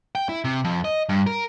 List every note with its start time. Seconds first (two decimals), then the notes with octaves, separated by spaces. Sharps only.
0.15 G5
0.29 E4
0.45 C3
0.64 F2
0.85 D#5
1.09 G2
1.27 A#4